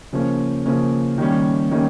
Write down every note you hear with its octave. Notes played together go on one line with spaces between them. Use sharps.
C#3 F3 A#3 C#4
C#3 F3 A#3 C#4
D#3 G3 A#3 C#4
D#3 G3 A#3 C#4